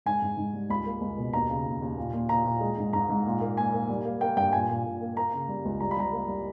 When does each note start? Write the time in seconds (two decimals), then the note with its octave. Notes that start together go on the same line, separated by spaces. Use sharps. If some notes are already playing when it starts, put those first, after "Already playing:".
0.06 G#2 G#5
0.22 G#2
0.37 G#2
0.53 G3
0.70 C#2 B5
0.86 A#3
1.01 C#2
1.18 B2
1.33 D#2 A#5
1.50 C#3
1.66 D#2
1.82 D#2
1.97 A#2
2.13 A#2
2.29 A#2 A#5
2.45 A#2
2.61 G#3
2.78 G#2
2.93 G#2 A#5
3.10 G#2
3.26 A#2
3.41 A#3
3.57 A#2 G#5
3.73 A#3
3.89 G3
4.05 A#3
4.21 A#3 G5
4.36 G2 G5
4.53 A#2 G#5
4.69 A#2
4.85 A#2
5.01 A#3
5.17 A#3 A#5
5.33 C#3
5.49 G3
5.65 C#2
5.80 G3 A#5
5.91 B5
5.97 G3 A#5
6.12 A#3
6.28 G3